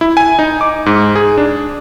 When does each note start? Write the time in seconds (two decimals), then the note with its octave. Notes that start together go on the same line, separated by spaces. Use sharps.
0.01 E4
0.17 G#5
0.39 D#4
0.61 D6
0.86 G#2
1.15 G#4
1.38 D4